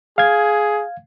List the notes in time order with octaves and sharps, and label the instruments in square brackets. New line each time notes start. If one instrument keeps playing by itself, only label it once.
[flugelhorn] G#4 [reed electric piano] F5 G#6